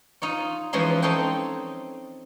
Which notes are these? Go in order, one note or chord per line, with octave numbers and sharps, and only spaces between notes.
D#4 F4 C#5
E3 F3 G#3 C#4 D#4 C6
C4 D#4 A4 C5 C#5 G5